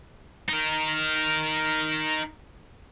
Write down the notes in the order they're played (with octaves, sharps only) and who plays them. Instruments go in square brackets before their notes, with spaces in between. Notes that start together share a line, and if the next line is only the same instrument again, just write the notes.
[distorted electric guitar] D#4 A#4